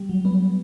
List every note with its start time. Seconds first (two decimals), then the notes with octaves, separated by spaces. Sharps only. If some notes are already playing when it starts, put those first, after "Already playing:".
Already playing: G3
0.09 F#3
0.25 B3